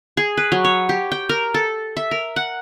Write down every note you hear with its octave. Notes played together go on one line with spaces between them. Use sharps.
G#4
B4
F#3
C#5
G4
G5
A#4
A4
E5
A#4
F#5